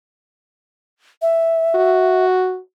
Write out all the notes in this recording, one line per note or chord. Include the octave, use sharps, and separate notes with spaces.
E5
F#4